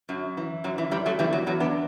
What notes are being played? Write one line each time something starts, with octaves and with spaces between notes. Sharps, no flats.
F#2 F#3
E3
F#2 F#3
E3
F#2 E3 G3
F#3 A3
E2 E3 G3
F#3
E2 F#3
B3 D4